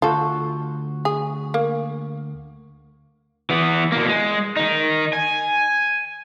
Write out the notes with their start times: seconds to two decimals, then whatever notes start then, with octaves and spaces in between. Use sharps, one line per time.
0.02 D2 F4 F#4 A4
1.05 G#4
1.54 A#3
3.50 E3 B3
3.92 B2 A#3
4.07 G#3
4.56 D#3 D#4
5.13 G#5